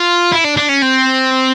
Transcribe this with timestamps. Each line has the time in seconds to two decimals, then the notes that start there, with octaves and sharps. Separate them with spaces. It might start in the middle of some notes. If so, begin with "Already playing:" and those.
Already playing: F4
0.32 E4
0.44 D4
0.57 D4
0.69 C#4
0.82 C4